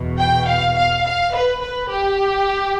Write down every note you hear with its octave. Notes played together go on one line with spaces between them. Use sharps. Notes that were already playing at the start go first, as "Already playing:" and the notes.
Already playing: E2 B2
G5
F5
F5
F5
B4
B4
G4